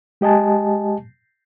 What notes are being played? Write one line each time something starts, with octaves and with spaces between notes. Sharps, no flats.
G#3 G4 D#5 G#5 A5